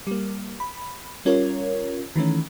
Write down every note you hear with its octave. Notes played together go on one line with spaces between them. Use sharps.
G3 A#3
B5
G3 C#4 F4 A#4 C#5
D#3 E3 A3 C#4